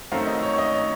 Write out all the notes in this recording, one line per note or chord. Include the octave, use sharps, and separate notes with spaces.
F#2 D#3 A3 C4 F5
D#5
C#5
C#5
D#5
C#5